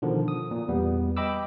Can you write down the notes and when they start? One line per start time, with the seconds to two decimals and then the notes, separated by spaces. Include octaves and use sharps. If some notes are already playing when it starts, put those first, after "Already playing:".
0.02 B2 D3 D#3 F3
0.28 D#6
0.51 A#2
0.68 E2 G3 B3
1.17 D#5 G5 B5 D6 E6